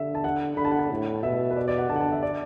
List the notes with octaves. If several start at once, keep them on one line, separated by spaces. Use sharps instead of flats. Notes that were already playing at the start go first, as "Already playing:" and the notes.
Already playing: D3 E5
A5
F#5
D3 B5
A5
F#5
A5
A2
B2 E5
B4
D5
D5
F#5
D3 A5
F#5
A5
E5
D5